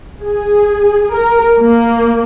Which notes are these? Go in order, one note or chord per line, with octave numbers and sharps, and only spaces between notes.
G#4
A#4
A#3